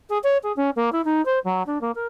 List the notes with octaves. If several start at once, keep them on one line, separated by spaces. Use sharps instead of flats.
G#4
C#5
G#4
C#4
A#3
E4
D#4
C5
F#3
D4
A#3
A#4